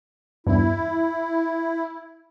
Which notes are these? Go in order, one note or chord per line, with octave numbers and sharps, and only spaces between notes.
E2 G2 E4